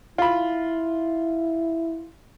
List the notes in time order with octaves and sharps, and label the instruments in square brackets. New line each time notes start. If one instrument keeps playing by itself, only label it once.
[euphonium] E4 [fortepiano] F4 B5